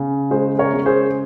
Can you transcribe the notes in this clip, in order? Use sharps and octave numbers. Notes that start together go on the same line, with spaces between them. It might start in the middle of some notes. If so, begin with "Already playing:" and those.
Already playing: C#3
G#3 G#4 C5
A#4 C#5
C#3
G#4 C5